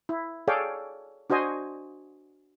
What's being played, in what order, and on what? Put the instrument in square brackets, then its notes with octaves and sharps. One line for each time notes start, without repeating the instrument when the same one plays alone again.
[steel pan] E4
G#4 A4 C#5 D5 F5 G5
D4 F#4 C5 D#5 G#5